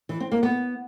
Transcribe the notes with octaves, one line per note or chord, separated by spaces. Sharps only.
E3
C4
A#3
B3